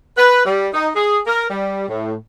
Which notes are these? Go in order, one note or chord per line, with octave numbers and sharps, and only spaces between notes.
B4
G3
D#4
G#4
A#4
G3
A2